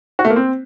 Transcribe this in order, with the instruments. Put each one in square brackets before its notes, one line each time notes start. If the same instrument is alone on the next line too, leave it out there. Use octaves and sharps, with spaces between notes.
[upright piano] F#4
A3
A#3
C4